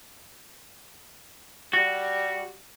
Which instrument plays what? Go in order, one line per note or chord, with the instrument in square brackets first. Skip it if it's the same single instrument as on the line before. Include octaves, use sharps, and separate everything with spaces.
[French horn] G3 [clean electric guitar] F#4